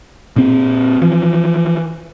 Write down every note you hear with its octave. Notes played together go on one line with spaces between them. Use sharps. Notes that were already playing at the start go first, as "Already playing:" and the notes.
A#2 C4
E3 F3